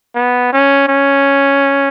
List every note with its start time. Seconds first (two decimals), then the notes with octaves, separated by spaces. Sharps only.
0.15 B3
0.53 C#4
0.88 C#4